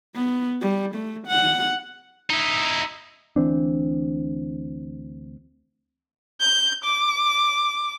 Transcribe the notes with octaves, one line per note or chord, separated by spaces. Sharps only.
B3
G3
A3
F#5
D#4 E4
D2 E3 C4 D4
G6
D6